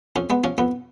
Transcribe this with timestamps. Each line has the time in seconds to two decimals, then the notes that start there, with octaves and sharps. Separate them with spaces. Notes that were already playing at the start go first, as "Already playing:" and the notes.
0.16 F2 C#4
0.30 G#3 B3
0.44 F3 C#4
0.58 F2 B3